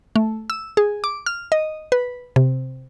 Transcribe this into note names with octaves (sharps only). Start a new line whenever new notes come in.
A3
E6
G#4
D6
F6
D#5
B4
C3